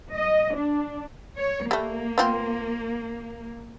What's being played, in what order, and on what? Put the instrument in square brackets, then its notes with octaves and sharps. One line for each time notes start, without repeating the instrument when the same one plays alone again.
[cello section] D#5
D4
C#5
[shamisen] G3 A3 [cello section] A#3
[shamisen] B3 C4 F4